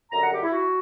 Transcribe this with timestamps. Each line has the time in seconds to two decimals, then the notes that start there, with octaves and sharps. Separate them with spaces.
0.12 F#2 D3 G3 A#5
0.22 F#5
0.32 G4
0.43 E4
0.53 F#4